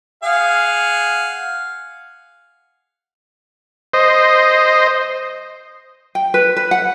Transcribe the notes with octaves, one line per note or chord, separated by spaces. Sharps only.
G#4 F5 F#5
C5 D#5
G5
B4
B4
F#5